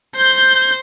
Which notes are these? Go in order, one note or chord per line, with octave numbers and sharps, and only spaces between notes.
C5 G6